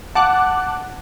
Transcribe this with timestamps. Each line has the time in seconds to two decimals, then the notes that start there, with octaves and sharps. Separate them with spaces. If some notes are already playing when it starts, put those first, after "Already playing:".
0.15 F#5 A5 D6 F#6